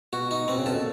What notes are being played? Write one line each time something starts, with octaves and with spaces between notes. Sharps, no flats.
B2 F#4
D#4
B2 C4
C#3
B2 A4
A#2